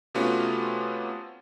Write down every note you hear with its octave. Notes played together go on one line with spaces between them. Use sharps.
C3 A3 B3 C#4 F4 F#4